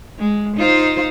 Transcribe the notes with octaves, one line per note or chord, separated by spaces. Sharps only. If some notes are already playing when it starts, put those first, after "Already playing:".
G#3
D#4 F4 C5